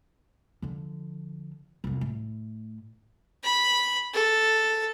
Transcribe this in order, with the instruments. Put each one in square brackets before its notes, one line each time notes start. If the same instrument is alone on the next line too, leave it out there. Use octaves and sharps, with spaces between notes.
[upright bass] D3 F3
C2 F2
A2
[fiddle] B5
A4